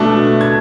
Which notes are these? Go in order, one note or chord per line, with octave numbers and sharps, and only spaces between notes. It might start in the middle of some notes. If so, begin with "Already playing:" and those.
Already playing: B2 A3 D4
G#6